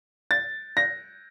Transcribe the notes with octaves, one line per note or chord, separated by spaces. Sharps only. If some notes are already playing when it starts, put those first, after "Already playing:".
A6
A#6